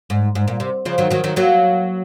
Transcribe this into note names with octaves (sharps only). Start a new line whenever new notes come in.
G#2
G#2
A#2
C3
C#3 F3
D#3 F#3
D#3 F#3
D#3 F#3
F#3 A#3